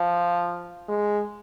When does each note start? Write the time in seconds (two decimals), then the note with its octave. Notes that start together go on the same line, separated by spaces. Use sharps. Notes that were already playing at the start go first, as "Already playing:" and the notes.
Already playing: F3
0.89 G#3